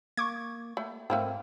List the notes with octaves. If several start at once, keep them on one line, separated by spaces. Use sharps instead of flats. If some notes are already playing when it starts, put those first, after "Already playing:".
A#3 C#6 D6 G#6
A3
G#2 A3 A#3 C4